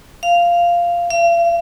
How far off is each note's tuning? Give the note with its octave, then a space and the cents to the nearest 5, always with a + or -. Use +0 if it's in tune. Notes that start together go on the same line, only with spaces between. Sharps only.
F5 -10
F5 -45